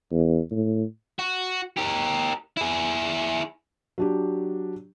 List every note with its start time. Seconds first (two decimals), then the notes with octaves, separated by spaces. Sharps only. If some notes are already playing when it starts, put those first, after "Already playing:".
0.12 E2
0.51 A2
1.19 F#4
1.77 G4 A#4
2.57 E4 G#4
3.98 F#3 D4 G4